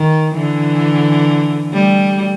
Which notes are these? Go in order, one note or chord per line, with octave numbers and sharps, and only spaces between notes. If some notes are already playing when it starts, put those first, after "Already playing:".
Already playing: D#3
D3 E3
G3 A3